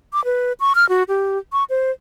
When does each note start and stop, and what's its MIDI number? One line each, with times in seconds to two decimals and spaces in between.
0.13 0.24 86
0.25 0.53 71
0.60 0.73 85
0.75 0.88 89
0.89 1.03 66
1.08 1.38 67
1.52 1.64 85
1.70 1.91 72